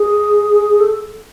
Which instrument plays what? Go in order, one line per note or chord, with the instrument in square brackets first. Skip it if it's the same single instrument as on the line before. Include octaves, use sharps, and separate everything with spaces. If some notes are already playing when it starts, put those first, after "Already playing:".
Already playing: [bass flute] G#4
A4